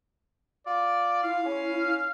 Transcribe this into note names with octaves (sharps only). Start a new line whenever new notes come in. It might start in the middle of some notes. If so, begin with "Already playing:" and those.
F4 D5
E4 F5
C#4